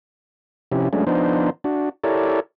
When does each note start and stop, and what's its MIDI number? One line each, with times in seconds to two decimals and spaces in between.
0.72 0.89 48
0.72 0.89 53
0.72 0.89 61
0.72 0.89 64
0.72 0.89 67
0.93 1.04 54
0.93 1.04 56
0.93 1.04 57
0.93 1.04 61
0.93 1.04 62
1.07 1.50 53
1.07 1.50 59
1.07 1.50 62
1.07 1.50 63
1.07 1.50 72
1.64 1.89 62
1.64 1.89 66
2.04 2.40 64
2.04 2.40 67
2.04 2.40 69
2.04 2.40 70
2.04 2.40 73
2.04 2.40 74